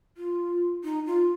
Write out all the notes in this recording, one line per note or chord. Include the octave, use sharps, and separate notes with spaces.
F4
D#4
F4